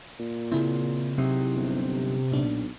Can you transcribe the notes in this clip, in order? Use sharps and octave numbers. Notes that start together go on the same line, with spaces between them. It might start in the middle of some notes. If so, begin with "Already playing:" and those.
A#2
C#3 C4 E4 G#4
C3 F#3 C4 D#4
G1
B1 A#2 D4